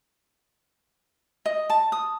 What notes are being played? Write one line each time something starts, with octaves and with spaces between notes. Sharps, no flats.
D#5
A5
D#6